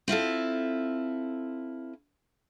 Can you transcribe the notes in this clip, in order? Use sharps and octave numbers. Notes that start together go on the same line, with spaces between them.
C4 E4 F4 A4